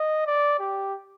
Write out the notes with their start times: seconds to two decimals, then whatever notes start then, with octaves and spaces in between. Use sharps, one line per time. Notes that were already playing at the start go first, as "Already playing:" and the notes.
Already playing: D#5
0.27 D5
0.60 G4